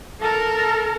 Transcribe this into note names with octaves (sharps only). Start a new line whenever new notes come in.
A4 A#4